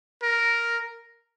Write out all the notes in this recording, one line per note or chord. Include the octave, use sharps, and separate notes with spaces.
A#4